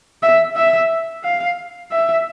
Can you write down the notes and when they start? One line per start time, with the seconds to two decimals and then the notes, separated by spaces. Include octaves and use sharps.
0.23 E5
0.56 E5
1.24 F5
1.91 E5